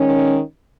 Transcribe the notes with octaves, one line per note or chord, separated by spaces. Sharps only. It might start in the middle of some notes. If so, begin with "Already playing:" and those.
Already playing: D#3 G#3 C#4